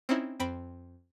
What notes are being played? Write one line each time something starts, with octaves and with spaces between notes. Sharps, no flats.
C4 C#4 D#4 E4
F2 C4 B5 D7